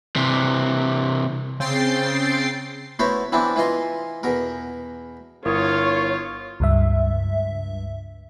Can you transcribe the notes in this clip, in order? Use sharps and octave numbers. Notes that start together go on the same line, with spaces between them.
C3 E3
C#3 C4 G5 A6 C7
A3 B3 E4 F#4 C5 C#5
E3 B3 C4 D4 E4
E3 E4 F4 D#5 C6
E2 B2 A#4
G1 E4 F4 A#4 C#5 D#6
C#2 G2 E5